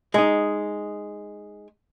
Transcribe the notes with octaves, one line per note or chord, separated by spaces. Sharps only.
G#3 D#4